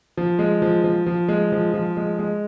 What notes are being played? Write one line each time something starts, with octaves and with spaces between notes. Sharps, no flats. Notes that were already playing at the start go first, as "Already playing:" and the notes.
F3
G#3
F3
F3
F3
G#3
F3
F3
G#3
G#3